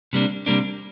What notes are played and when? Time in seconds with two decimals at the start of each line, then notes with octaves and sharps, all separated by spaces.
0.13 C3 G3 A#3 D4
0.46 C3 G3 A#3 D4